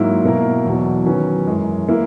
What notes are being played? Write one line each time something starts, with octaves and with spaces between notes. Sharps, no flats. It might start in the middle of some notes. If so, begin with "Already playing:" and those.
Already playing: G#2 F#3 A#3 E4
B2 A#3 E4 A#4
E2 B2 F#3
D#3 F#3 C#4 F#4 B4
F#2 E3 G#3
E3 A#3 E4